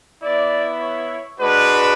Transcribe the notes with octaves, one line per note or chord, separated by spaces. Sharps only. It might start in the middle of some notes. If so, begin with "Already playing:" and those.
B3 E4 D5
C#5
G#3 D4 F#4 B4